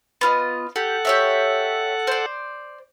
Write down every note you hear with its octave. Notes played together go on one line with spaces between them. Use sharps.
B3 F4 D#5
G4 A4 F#5
G4 C#5 E5
C5 D5